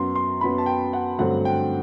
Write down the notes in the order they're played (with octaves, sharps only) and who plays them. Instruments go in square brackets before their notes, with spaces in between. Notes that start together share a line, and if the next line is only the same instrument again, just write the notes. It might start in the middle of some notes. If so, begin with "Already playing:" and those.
Already playing: [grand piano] F#2 F#3 B3 C6
C6
F#2 F#3 B3 B5
A5
G5
F#5
G2 D3 F#3 A3 C4 F#5
G5